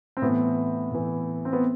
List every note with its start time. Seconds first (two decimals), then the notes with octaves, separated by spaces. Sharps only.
0.17 C4
0.22 A2 E3 B3
0.92 A2 E3
1.45 C4
1.53 B3